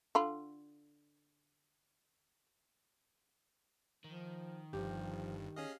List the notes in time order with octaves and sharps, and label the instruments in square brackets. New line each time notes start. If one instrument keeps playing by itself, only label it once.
[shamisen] D3 F4 B5
[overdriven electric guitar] D#3 [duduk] F3
[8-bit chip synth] G1 G2 [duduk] F3 [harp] G4
[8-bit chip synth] C#4 G#4 D#5 [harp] F5